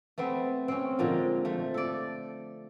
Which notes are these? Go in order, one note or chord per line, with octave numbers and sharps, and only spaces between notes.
A3 B3 C4
C4 C#4
A#2 D3 F3 G#3
F3 A3
A4 D5